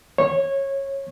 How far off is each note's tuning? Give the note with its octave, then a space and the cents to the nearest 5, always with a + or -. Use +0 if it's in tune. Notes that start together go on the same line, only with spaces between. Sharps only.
C#5 -20